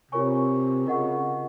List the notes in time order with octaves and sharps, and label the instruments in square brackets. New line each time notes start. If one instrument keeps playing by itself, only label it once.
[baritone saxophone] C3 [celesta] F4 A#4 C#5 G#5 C#6
[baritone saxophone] C#3 [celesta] F4 A#4 D#5 F#5 C#6